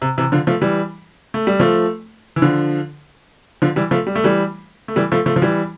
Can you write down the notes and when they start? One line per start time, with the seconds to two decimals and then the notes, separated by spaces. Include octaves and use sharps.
0.02 C3
0.18 C3 E3
0.32 D3 F3
0.47 F3 A3
0.61 E3 G3
1.34 A3
1.47 G3
1.60 F3 A3
2.36 E3
2.42 D3 F3
3.62 D3 F3
3.76 E3 G3
3.91 F3 A3
4.07 G3
4.16 A3
4.24 E3 G3
4.88 A3
4.96 E3 G3
5.12 F3 A3
5.26 F3 A3
5.36 F3
5.42 E3 G3